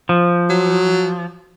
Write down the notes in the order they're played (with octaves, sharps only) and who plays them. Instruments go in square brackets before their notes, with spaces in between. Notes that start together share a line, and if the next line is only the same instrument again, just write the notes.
[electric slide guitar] F3
[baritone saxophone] F#3